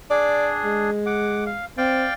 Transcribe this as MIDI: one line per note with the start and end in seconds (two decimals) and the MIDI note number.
0.10 0.90 62
0.10 0.90 68
0.10 0.53 74
0.64 1.55 56
1.06 1.44 78
1.06 1.44 86
1.46 1.65 77
1.78 2.06 60
1.78 2.14 74
1.78 2.14 77
1.78 2.14 79